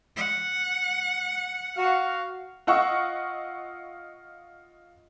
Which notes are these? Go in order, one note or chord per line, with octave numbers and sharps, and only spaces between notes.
F#5
F#4 F5
F4 D#5 F#5 C#6 E6